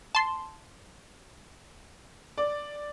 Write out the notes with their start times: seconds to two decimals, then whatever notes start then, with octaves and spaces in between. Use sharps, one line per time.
0.15 A5 C6
2.38 D5